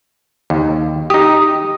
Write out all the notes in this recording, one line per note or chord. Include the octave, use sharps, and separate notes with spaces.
D#2
D#4 G4 D#6